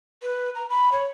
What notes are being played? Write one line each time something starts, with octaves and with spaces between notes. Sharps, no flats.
B4
A#5
B5
C#5